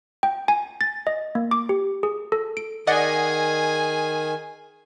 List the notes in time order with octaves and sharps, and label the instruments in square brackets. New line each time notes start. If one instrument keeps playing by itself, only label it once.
[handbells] G5
G#5
A6
D#5
A#3
D6
G4
G#4
A4
D7
[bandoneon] D#3 [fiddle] G#4 G#5 [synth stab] D5 D#5 F#5